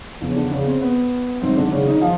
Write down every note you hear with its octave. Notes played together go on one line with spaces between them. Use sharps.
E2 C#3 F3
C#4
D3 D4
C#3 C#4
C4
B3
G#1 G#2 D#3 F#3 C4
D3 D4
C#3 C#4
D#3 D#4
F3 F4